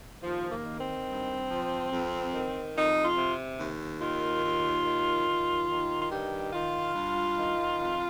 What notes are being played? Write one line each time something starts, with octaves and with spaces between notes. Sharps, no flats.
D#2 F3
A#3
D#3
C4
G2
F3
F2
D#3
F2 D#4
F4
C3
D#2
D#3 F4
D#2
D#3
D#2
D#3
F4
G2 G4
D#3 F4
G2
D#3
F2